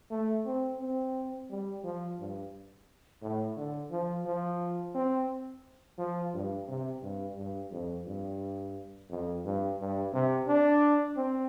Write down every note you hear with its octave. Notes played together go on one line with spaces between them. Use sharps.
A3
C4
C4
G3
F3
G2
A2
D3
F3
F3
C4
F3
G2
C3
G2
G2
F2
G2
F2
G2
G2
C3
D4
C4